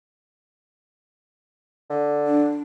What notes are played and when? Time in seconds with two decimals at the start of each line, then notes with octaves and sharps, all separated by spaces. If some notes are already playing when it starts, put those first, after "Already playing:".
1.90 D3
2.27 D4